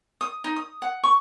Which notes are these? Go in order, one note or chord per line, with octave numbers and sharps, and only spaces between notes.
D#6
D#4
D#6
F#5
C#6